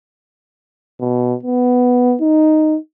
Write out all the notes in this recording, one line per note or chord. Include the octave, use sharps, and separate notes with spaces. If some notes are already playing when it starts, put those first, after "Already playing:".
B2
B3
D#4